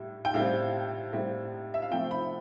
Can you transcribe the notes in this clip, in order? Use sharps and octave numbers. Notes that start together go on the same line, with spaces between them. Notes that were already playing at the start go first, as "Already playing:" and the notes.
Already playing: A2 G3
G5
A2 G3 C4 F5
A2 G3 C4
E5
F5
C3 F3 A3 C4 G5
B5